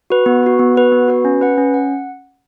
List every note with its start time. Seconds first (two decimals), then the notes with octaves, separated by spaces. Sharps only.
0.10 F#4 B4
0.26 B3
0.43 F#4 B4
0.59 B3
0.75 F#4 B4
0.92 B3
1.08 F#4 B4
1.25 C#4
1.41 B4 F#5
1.58 C#4
1.74 F#5